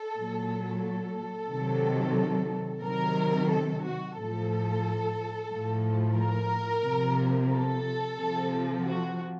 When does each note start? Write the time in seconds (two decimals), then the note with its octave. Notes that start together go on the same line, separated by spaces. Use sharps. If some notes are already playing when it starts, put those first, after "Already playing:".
Already playing: A4
0.16 A#2 F#3
0.83 A4
1.50 C3 D#3 F#3
2.83 C3 D#3 F#3 A#4
3.51 A4
3.84 F#4
4.17 A2 F3 A4
5.51 A2 F3
6.18 A#4
6.84 C3 F3
7.51 A4
8.18 C3 F3
8.85 F#4